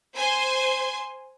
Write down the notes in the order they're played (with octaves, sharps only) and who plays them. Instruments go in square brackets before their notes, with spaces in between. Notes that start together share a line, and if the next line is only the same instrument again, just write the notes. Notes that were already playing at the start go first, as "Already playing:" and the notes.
[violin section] C5 G#5 C6